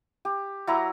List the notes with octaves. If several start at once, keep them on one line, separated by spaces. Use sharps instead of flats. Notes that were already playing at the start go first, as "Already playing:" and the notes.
G4
F#3 E4 A#5